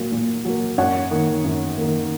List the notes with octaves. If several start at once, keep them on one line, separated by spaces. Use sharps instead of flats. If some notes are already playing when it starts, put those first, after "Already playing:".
Already playing: A#2 F#3 A#3
A#2
F#3 A#3
F#2 C#5 F#5
D#3 A#3
F#2
D#3 A#3